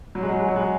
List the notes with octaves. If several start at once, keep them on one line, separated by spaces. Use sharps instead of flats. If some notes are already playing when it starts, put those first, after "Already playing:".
F#3
G#3
F#3
G#3
F#3
G#3